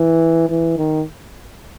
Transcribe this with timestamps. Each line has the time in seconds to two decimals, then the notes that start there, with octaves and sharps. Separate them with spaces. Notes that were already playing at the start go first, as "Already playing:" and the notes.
Already playing: E3
0.49 E3
0.78 D#3